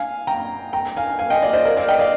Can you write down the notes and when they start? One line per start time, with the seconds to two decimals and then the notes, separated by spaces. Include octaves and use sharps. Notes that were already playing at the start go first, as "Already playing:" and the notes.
Already playing: F5 G#5
0.27 G5 A#5
0.73 G5 A#5
0.96 F5 G#5
1.19 F5 G#5
1.30 D#5 G5
1.42 D5 F5
1.53 C5 D#5
1.65 A#4 D5
1.77 D5 F5
1.88 D#5 G5
1.99 D5 F5